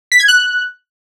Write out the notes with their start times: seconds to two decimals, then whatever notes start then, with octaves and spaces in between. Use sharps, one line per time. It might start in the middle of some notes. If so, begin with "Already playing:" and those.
0.12 B6
0.20 G#6
0.28 F#6